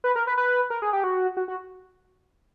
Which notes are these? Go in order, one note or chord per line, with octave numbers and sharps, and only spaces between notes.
B4
A#4
B4
B4
A#4
G#4
G4
F#4
F#4
F#4